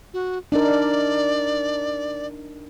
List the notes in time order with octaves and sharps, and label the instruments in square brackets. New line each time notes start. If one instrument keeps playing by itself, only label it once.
[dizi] F#4
[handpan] D4 D#4 A#4 [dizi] D5